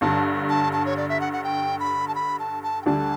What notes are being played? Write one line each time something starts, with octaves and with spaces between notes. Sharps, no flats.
G1 G2 D3 A5
A5
A5
C#5
D5
E5
F#5
F#5
G5
B5
A5
B5
A5
A5
G5
D2 D3 G3 D4 A5